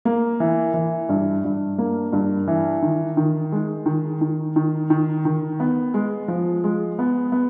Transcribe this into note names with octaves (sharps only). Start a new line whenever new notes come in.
A#3
E3
E3
G2
G2
A#3
G2
E3
D#3
D#3
G#3
D#3
D#3
D#3
D#3
D#3
B3
G#3
F3
G#3
B3
B3